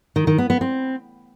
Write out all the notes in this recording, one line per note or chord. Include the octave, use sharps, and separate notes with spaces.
D#3
D#3
B3
B3
C4